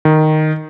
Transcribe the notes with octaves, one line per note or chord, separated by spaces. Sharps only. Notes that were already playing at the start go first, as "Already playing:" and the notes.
D#3